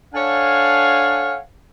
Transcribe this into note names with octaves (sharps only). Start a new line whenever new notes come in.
D4 A4 C#5 F5 F#5 G#5